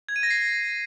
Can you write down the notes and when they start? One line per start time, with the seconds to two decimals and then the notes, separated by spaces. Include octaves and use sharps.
0.09 G#6
0.16 D#7
0.23 A#6
0.30 C7